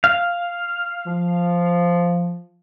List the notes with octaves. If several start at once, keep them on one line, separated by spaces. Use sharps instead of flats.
F5
F3